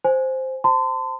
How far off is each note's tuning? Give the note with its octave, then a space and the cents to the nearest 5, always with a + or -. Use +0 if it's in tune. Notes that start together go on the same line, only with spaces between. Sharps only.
C5 +0 G#5 +5
C5 +0 A5 +35 C6 -35